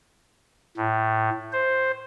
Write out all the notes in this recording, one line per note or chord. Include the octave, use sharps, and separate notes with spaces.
A2
C5